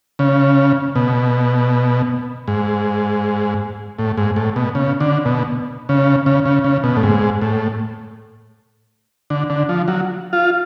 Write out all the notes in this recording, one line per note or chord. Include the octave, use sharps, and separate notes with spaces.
C#3
B2
G#2
A2
G#2
A2
B2
C#3
D3
B2
C#3
C#3
C#3
C#3
B2
A2
G#2
A2
D3
D3
F3
F#3
F4